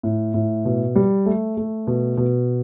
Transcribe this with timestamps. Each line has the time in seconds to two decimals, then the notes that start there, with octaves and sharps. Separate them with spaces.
0.03 A2
0.34 A2
0.65 B2
0.96 G3
1.26 A3
1.57 A3
1.87 B2
2.17 B2